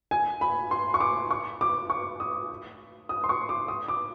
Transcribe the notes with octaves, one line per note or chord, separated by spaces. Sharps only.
G#5
B5
C6
C#6
D6
C#6
D6
C#6
D#6
D#6
C6
C#6
D6
D#6
D6